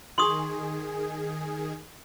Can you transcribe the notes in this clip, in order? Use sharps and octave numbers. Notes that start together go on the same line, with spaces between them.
D#3 G#4 C6 C#6 D#6